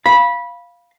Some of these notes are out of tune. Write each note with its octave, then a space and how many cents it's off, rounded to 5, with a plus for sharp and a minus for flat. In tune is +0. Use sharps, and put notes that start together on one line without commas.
F5 +0 B5 -20